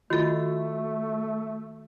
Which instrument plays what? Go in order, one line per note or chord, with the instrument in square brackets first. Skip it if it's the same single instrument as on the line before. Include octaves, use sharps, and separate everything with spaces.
[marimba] D#3 A4 [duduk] A3 [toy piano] F4 F#4